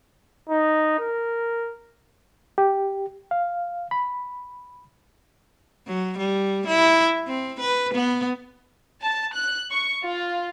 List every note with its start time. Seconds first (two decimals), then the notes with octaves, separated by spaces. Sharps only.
0.49 D#4
0.99 A#4
2.58 G4
3.31 F5
3.91 B5
5.87 F#3
6.18 G3
6.67 E4
7.27 C4
7.59 B4
7.93 B3
9.02 A5
9.34 F#6
9.71 C#6
10.04 F4